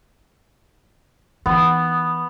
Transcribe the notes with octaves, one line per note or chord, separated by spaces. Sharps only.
E3 B3 D#4